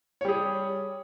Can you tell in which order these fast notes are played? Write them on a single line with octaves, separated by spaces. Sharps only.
C#5 G3 G#4